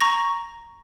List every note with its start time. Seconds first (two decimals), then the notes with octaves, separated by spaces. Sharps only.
0.01 A#5 C#6 A#6